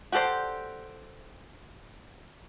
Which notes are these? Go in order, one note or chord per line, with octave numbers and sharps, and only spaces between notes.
F#4 G4 A4 C5 D5